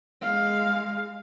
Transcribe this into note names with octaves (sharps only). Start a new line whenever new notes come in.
G#3 F5